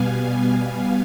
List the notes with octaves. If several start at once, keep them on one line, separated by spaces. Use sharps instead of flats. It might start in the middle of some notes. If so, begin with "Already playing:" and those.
Already playing: B2 G3 B3 F5 G#5
F5 G#5